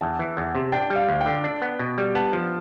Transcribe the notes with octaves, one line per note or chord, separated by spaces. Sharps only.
E2 A5
E3
E2
C3
D4 G5
G3
F5
D2
G5
D3
D4
B3
B2
G3
B3 A5
F3